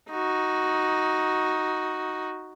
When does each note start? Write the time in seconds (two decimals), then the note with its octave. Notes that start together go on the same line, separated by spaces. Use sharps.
0.11 D#4 F#4